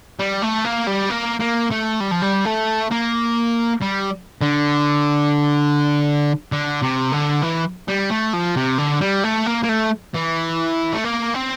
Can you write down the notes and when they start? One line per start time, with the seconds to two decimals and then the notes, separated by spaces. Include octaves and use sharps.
0.19 G3
0.42 A3
0.65 A#3
0.87 G3
1.10 A#3
1.40 A#3
1.71 A3
2.00 G3
2.11 F3
2.22 G3
2.45 A3
2.91 A#3
3.82 G3
4.41 D3
6.52 D3
6.83 C3
7.12 D3
7.43 E3
7.88 G3
8.10 A3
8.33 F3
8.56 C3
8.78 D3
9.01 G3
9.24 A3
9.46 A#3
9.63 A#3
9.69 A3
10.14 E3
10.93 A3
11.05 A#3
11.34 C4